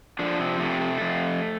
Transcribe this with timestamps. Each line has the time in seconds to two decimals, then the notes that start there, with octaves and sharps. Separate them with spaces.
0.19 D3 F3 D4
0.39 C3 C4
0.60 C3 A3
0.81 A3
1.01 F2